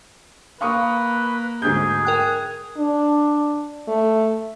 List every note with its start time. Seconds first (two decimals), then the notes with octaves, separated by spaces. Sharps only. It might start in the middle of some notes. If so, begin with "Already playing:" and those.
0.61 A#3 B4 F5 C#6 D#6
1.62 D2 G#2 G#4 G6
2.05 A#4 G5 F#6
2.78 D4
3.88 A3